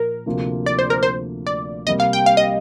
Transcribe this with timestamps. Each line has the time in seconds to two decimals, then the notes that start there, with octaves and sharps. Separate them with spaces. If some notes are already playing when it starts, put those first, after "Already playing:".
Already playing: A#2 F3 A#4
0.26 D2 C3 F3 A#3 F4
0.66 D5
0.79 C5
0.90 A#4
1.03 C5
1.47 D5
1.86 C2 C3 G3 A#3 D#5
2.00 F5
2.13 G5
2.26 F5
2.37 D#5